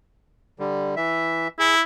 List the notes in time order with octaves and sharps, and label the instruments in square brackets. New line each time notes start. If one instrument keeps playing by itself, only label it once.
[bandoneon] D3 G3
E3 E5
[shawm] E4 [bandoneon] G#4